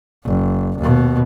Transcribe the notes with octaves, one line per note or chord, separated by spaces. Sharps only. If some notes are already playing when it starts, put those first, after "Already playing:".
F#1
D#2 B2